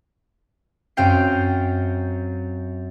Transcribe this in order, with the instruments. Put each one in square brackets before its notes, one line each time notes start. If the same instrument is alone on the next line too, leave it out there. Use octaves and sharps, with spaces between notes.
[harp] F#2 C4 F5 G5 C7